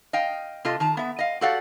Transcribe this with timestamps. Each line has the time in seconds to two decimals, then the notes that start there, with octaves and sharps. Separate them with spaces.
0.13 D#5 F5 G5
0.65 C3 F4 A4 D#5
0.80 D#3 A5 A#5
0.97 B3 E5
1.19 D#5 F5
1.41 F#4 G4 A4 D5 F5 F#5